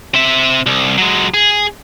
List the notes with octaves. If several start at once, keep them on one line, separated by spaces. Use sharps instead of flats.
C4 E5
C2
F#3 G#3
G#4